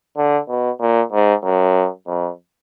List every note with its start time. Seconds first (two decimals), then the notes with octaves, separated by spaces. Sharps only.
0.17 D3
0.48 B2
0.80 A#2
1.12 G#2
1.44 F#2
2.07 F2